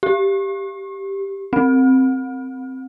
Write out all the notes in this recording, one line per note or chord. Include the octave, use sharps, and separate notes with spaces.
G4
C4